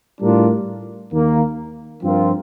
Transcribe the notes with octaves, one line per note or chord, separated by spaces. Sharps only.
A2 G3 D4 F4 A#4
D#2 D#3 A#3
G2 F3 C4 F4 A#4